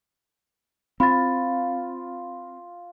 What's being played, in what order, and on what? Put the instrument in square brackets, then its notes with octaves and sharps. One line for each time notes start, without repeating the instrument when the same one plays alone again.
[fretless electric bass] C4 [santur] F4 [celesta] B5 A6